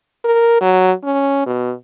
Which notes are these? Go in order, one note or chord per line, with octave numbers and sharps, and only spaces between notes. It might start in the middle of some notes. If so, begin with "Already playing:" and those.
A#4
F#3
C#4
B2